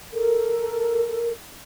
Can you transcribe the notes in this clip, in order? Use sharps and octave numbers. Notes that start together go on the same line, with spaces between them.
A4 A#4